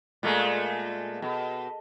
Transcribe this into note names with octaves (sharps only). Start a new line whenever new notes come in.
A#2 G#3 A3
B2